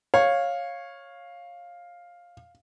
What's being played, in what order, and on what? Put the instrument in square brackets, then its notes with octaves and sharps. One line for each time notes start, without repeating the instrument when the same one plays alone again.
[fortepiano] C#5 [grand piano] F5